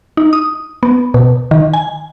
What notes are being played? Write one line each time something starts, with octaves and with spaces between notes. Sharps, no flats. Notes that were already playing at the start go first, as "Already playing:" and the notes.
D#4
D#6
B3
B2
D#3
G#5